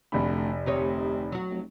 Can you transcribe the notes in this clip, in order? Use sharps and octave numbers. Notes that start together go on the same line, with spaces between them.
F1 D2 B5
D2 C3 D#4 C#5
F#3 F#4
F1